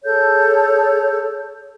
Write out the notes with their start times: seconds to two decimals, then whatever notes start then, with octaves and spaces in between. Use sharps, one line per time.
0.03 G#4 A4 C#5 G6